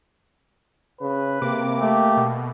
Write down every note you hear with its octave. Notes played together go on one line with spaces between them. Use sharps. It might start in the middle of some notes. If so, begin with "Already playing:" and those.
C#3 B4
C3 A#3 D6
A3 G4
B2